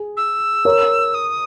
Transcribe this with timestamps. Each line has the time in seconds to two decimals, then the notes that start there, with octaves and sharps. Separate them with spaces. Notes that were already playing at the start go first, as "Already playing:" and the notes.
Already playing: G#4
0.16 E6
0.65 A#4 C#5
1.13 D#6